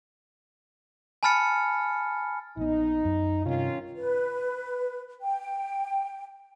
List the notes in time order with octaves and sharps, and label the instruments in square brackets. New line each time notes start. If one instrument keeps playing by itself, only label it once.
[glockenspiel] G#5 A5 B5 F6 A6 C#7
[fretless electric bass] A#1 B3 [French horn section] D#4
[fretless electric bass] F#2
[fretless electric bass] G2 C3 [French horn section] D#3 C#4 F4
[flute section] B4
G5